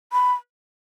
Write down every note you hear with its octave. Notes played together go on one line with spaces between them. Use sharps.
B5